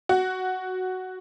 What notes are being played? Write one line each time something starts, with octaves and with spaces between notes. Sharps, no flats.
F#4